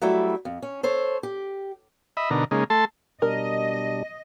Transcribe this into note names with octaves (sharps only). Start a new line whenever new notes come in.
F#3 G3 A3 E4 E5
F2
C#4
A4 C5 C#5
G4
D#5 E5 B5
B2 D3 D#4 A#4
C#3 G#3 A#3 D#4
A3 A4 A5 C6
B2 G3 D4 A#4 D#5